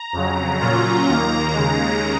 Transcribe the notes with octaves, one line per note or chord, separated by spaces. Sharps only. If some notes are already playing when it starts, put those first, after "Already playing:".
Already playing: A#5
F2 C#3 F#3
A#2 F#3 C#4 F4 A#5
D#2 D#3 A#3 A#5
D#2 C#3 G#3